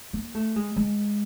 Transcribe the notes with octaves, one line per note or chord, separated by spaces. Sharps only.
A#3
A3
G#3
G#3